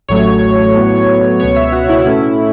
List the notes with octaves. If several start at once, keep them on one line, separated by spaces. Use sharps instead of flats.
A1 A2 F#3 A3 C#5
A2 F#3 B3
C#2 B2 B3 C#5
E5
F#4
E4
A2 A3 C#4